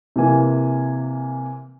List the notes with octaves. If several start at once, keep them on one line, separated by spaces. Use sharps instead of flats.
C3 E3 A#3 G#5